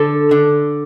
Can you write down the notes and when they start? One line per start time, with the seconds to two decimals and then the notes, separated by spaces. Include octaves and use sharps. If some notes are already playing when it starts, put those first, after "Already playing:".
Already playing: D3 A4
0.31 D3